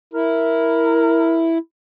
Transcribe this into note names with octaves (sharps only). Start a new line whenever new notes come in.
E4 A#4